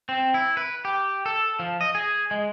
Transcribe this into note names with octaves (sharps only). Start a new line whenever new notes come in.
C4
E4
B4
G4
A4
F3
D#5
G#4
G#3